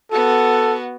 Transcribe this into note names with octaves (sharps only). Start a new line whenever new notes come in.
B3 F#4 A4